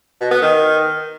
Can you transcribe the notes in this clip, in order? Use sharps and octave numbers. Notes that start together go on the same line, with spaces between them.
B2
B3
D#3